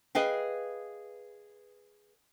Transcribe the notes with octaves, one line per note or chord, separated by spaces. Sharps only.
G#4 B4 D#5 F5 G5